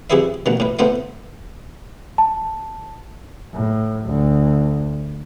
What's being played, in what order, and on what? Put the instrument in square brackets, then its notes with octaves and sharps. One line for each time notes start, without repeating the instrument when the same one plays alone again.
[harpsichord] F2 E4 G4 G#4 B4 E5
A1 B2 D#3
A2 B4
A2 A3 B3 C5 F5
[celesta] A5
[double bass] A2
D2